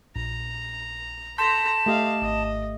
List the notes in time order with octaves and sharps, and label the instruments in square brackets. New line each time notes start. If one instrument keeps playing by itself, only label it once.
[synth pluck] A#1 [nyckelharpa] A#5
[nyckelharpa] A4 A#5 [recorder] A5 [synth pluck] C6 G6 B6
[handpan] A3 G4 [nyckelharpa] D#5 F5
[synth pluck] G#1 [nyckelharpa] D#5